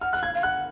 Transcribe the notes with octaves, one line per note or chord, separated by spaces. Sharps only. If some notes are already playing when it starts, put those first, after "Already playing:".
F#5 F6
F#6
F5 G#6
F5
F#5 F#6